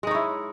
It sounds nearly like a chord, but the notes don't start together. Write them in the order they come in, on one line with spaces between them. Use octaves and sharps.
G#3 D#4 C#5 E4